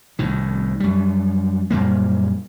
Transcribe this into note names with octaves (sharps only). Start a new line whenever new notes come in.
C2 A2 D#3
F#2 G3
F#2 A#2 G3 A#3